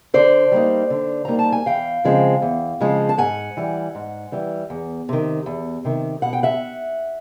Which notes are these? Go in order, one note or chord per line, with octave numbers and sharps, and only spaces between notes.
D3 C5 D5
G3 A#3 D#4
D3
G3 A#3 D#4 A#5
A5
G#5
E2 F5 G5
C#3 F3 G#3 C4
E2
C#3 F3 G#3 C4
A5
G#2 F#5 G#5
E3 G3
G#2
E3 G3
E2
C3 D#3
E2
C3 D#3
B2 F#5
G5
E5 F#5